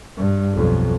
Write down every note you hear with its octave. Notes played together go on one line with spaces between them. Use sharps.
G2
B1 F2